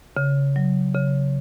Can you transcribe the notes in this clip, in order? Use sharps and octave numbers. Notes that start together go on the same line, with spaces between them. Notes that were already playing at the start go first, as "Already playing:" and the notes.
C#3
F#3
C#3